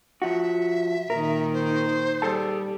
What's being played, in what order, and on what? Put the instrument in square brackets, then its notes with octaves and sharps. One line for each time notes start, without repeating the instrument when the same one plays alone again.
[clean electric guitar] F3 F#4 [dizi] E5
[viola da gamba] A#2 D#3 [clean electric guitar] A#4
[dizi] C5
[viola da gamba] G3 [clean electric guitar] G#4 A4 A5